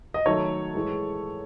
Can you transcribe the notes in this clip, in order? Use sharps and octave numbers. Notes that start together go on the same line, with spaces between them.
D#5
D#3 F#3 A3 A4 C#5
A2 E3 G#3